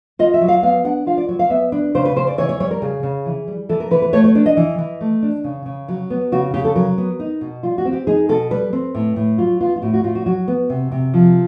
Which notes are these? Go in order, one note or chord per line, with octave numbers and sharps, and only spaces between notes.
F4 D#5
E5
F#3
F5
B3 F5
D4 F#5
F4 F5
D5
F#3 C#5
F5
B3 E5
D4 B4
C#3 C5
B4
C#3 C5
D5
E3 C#5
C#5
G3 C#5
A#4
C#3 G#4
C#3
E3
G3
E3 A4
A#4
E3 B4
B4
A3 C#5
C#5
D4 D5
D#5
E3
E3
A3
D4
C#3
C#3
F#3
B3
C#3 F#4
C#3 G4
A4
F#3 A#4
B3
D#4
B2
G3 F4
F#4
C4
G4
D#4 G#4
B2 A4
G3 B4
C4
A2
A2
F#3 F4
B3 F4
F4
A2 F#4
F#4
A2 F4
F#4
F#3 F#4
B3
C3
C3
F3